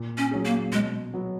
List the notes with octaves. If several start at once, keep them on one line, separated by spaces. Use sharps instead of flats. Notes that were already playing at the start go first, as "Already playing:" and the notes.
Already playing: A#2
C#4
F#3 C#4 G#4
A#3
B2 G#3
F#3 B3